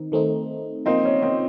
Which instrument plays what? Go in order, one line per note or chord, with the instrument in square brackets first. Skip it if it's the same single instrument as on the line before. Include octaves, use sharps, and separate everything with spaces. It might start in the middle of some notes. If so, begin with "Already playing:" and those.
Already playing: [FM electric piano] D#3 C4 D#4
D#3 A3 C4 D#4
[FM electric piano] F3 A#3 F4 [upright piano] C4 D#4
[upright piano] C#4
C4 D#4